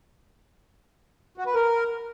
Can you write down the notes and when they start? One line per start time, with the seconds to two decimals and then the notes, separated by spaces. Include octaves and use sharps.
1.38 F#4
1.46 B4
1.55 A#4